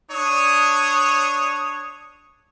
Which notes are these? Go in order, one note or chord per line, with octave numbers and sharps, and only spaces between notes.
D4 C#5 D#6